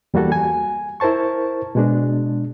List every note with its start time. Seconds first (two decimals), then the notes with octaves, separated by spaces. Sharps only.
0.14 E2 G3 A#3 F#4 A4
0.32 G#5
1.00 E4 A#4 C5 A5 C#6
1.75 B2 G#3 D4